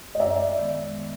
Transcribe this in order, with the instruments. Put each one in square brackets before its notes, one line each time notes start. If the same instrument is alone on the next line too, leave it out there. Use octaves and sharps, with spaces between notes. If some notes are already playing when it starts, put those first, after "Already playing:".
[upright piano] D#5
[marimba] F#2 [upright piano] D5 E5
[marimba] D#3 G#3 B3